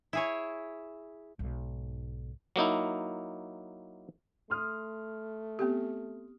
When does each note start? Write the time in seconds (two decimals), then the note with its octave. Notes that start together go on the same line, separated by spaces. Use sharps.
0.13 E4 G#4 C#5
1.39 B1 G#2
2.56 F#3 A#3 D#4 E4
4.50 A3 C6 D#6 F6
5.59 B3 C4 G4